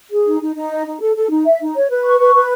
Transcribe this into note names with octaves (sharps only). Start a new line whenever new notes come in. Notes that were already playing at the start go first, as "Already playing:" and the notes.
G#4
D#4
D#4
D#4
D#5
D#4
A4
A4
D#4
E5
D#4
C#5
B4
C#6
B4
B4